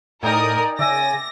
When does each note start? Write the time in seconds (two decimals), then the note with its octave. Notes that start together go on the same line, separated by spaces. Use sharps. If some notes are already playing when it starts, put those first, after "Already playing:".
0.23 A2 D#4 A#4 D5 G5 G#5 D#6
0.79 C#3 D5 E5 G#5 A#6